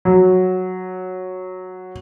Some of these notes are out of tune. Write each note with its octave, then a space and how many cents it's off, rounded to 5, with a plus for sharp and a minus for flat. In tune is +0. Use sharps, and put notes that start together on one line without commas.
F#3 -5